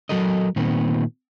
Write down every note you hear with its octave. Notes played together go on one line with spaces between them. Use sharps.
F#3 F#4 A4 A#4 D#5
A#2 D#3 B3 C4